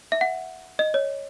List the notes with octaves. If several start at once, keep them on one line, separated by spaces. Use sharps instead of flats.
E5
F#5
D#5
C#5